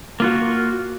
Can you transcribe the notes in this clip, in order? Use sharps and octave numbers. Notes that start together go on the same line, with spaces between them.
A#3 F4 F#4